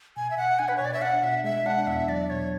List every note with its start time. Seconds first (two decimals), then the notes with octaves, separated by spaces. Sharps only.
0.17 B2 G#5
0.31 E5
0.37 B2 F#5
0.59 D4 G#5
0.68 B4
0.77 C#5
0.81 B2 D5
0.93 E5
1.01 D4 F#5
1.23 B2 E5
1.44 G#3 E5
1.66 D4 F#5
1.87 E2 E5
2.09 F#3 D5
2.29 B2 C#5